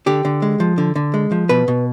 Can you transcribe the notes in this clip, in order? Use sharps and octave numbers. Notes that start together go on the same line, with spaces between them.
D3 G4
D3
G#3
F3
D3
D3
G#3
F3
B2 B4
B2